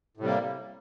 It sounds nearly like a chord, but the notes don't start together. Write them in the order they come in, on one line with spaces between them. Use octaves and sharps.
A2 C3 G3 A#3